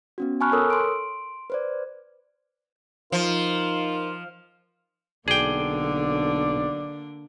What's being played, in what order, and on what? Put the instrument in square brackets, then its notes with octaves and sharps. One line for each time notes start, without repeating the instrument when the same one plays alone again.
[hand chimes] B3 C#4 F#4
G#5 A5 B5 C#6 F6 F#6
A4 A#4 C#5 D#6 E6
C6 D7
B4 C5 D5
[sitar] F3 [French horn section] D#4 A#4 [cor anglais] F4
[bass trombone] B1 [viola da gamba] D3 A#3 D4 [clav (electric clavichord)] G#4 G5 [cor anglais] D5